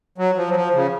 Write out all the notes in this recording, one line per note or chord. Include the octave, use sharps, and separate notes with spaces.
F#3
F3
F#3
F3
C#3